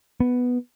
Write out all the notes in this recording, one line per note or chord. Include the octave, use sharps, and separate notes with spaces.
B3